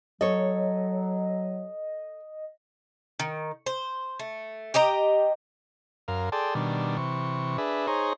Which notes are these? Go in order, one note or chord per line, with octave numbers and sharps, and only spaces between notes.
F#3 A4 C#5 D#5
D#3
C5
A3
G4 D#5 G5 A#5
F#2 A#4 F5
G#4 A4 D5 G5 A5 C6
B2 D#3 G3 D4
C3 E3 C#6
D4 G#4 B4 E5
D#4 G#4 C5 C#5 A#5